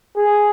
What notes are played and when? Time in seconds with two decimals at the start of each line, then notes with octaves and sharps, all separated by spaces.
0.16 G#4